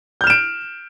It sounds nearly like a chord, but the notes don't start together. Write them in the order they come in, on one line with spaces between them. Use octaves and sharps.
G6 F6 E7 D7